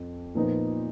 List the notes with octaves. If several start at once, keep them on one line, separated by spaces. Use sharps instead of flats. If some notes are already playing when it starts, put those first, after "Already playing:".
Already playing: F2
A#2 F3 B3 D#4